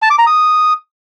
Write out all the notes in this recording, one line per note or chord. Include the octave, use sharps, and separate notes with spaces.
A5
D6
A#5
D#6